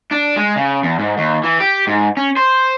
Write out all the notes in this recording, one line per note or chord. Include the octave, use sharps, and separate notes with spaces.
D4
G#3
C#3
E2
G#2
D#2
E3
G4
G#2
C#4
C5